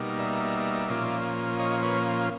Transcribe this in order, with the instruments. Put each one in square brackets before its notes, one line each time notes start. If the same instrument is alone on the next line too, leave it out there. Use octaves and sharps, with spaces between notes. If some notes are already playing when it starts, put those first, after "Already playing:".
Already playing: [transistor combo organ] B2 G3 A#3 D#4
D5 E5
A#2 F3 A#3 C#4 F4
C#5 D#5
B4 C#5